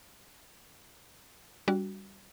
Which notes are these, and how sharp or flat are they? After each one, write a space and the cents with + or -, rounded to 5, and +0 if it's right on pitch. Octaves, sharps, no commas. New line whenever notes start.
G3 +0 D4 -35 F#4 +0